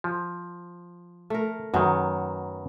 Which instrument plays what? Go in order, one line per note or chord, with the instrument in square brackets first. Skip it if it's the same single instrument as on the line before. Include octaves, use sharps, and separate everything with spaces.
[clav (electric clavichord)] F3
[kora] A3 A#4
[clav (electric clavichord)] F#2 D#3 [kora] F#3 B3